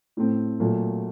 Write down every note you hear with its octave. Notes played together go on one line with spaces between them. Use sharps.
A2 A3 C4
A#2 F#3 A3